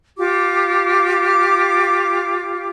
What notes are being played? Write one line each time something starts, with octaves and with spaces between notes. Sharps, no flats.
F4 G4 D6